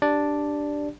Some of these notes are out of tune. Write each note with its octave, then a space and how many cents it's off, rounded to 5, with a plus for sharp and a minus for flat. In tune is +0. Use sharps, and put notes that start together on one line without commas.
D4 +0 G4 +0 D5 +0